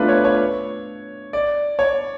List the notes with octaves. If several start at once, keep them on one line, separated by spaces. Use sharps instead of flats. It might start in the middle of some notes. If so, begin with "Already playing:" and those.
Already playing: A3 B3 D4 F4 B4
C#5
C#5
D5
C#5